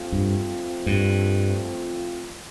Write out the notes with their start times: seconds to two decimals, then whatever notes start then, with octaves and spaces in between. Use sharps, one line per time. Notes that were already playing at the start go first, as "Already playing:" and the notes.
Already playing: F3 A3 C4 F4
0.12 G2
0.86 G2